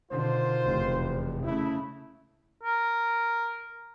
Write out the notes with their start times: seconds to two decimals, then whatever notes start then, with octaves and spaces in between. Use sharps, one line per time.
0.11 B2 D3 D#3 F4 C5
0.65 F1 E2
1.44 C#3 A3 E4
2.63 A#4